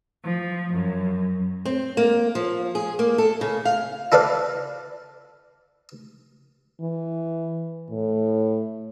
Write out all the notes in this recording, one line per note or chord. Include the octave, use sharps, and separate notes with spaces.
F3
F#2
C4
A#3
F3
G#4
A#3
A4
C#3
F5
E4 A4 B4 D5 F5
E3
A2